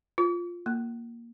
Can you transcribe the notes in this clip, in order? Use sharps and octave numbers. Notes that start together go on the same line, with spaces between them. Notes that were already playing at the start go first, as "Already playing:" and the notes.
F4
A#3